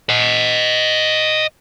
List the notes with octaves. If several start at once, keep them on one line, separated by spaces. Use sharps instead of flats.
D#5 F#5